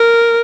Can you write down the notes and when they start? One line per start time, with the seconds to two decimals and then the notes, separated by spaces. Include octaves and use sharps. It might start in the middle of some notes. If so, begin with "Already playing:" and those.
Already playing: A#4